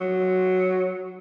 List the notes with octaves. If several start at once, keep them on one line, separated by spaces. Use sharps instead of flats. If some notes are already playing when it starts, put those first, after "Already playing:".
F#3